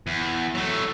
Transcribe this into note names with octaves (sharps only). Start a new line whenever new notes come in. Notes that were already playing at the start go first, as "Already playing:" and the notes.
E2
F#3 A3